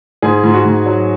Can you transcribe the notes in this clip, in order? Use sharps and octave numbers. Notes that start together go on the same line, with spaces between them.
G#2 G#4
G#2
F#4
G#2
F#3